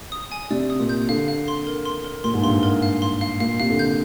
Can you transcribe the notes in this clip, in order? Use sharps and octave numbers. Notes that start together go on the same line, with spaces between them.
D#6
G#5
C3 D5
D#6
A#2
G6
D3 F5
F5
C6
A#4
C6
A#4
A#2 C6
G#2
G2 C6
G#2
A#4
F5
C6
F5
A#2 F5
C3 F5
D3
G6